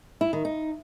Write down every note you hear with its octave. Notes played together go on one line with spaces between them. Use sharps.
E4
D#3
D#4